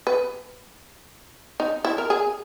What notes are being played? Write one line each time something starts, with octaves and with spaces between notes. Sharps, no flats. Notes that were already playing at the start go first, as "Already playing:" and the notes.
B4
D#4
E4
A#4
G#4